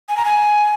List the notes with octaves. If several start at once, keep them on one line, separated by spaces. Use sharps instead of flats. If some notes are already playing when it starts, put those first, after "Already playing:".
G#5
A#5
G#5